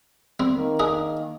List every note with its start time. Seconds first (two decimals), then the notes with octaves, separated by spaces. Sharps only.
0.40 G3 C4
0.56 D#3 A#3
0.79 D4 D#4 G#4